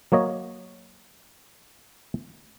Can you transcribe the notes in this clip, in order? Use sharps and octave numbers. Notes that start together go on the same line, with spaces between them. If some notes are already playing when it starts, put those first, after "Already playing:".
F#3 A#3 C#5 D#5